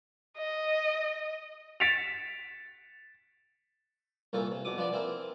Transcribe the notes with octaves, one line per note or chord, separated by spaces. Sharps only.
D#5
A6 B6 C#7 D7 E7 F7
C2 A#2 E3 A4 A#4
C3
E2 B2 D6 D#6
F3 B3 D4 D5
E3 C4 E4 A#4